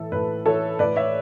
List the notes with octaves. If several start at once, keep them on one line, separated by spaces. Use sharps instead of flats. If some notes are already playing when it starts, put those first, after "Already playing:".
Already playing: A2 E3 A4
A2 B4
E3 A4 C#5
A2 B4 D5
C#5 E5